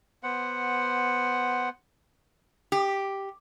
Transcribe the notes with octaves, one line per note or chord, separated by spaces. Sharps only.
B3 C5 F#5
G4